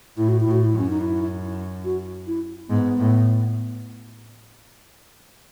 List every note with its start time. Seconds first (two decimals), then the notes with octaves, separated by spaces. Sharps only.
0.17 A2 E4
0.28 F#4
0.40 E4
0.46 A2
0.51 F#4
0.63 E4
0.73 F#2
0.79 C#4
0.90 D#4
1.01 E4
1.85 F#4
2.27 E4
2.69 G#2 B3
2.98 A2